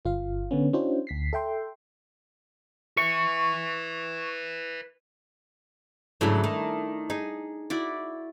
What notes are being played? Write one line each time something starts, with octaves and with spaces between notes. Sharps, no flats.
G1 F4 F5
D3 B3 C#4
C#4 D4 E4 F#4 C5
D2 B6 C7
A4 E5 G5 C6
B4 E5 C#6
G#2 C#3 F#3 A3 D4 E4
D#3
D#4 G#4
E4 F#4 D5